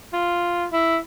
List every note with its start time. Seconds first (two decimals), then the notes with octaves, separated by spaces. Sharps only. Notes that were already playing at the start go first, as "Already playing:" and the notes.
0.13 F4
0.72 E4